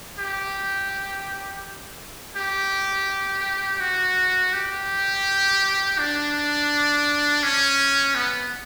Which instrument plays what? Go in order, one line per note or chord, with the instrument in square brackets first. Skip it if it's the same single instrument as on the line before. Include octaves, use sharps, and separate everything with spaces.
[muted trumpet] G4
G4
F#4
G4
D4
C#4
B3